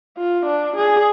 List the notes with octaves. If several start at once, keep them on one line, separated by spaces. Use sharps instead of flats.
F4
D4
G#4